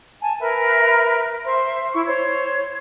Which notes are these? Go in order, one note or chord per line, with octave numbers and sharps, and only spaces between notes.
G#5 A5
A#4 B4 E5
C5 E5 C6
E4 C#6
C5 C#5 G#6